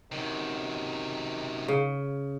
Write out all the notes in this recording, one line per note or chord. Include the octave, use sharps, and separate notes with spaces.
F#2 C3 D#3
C#3